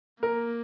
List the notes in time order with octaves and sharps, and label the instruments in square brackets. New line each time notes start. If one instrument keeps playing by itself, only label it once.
[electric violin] A#3 [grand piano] A#4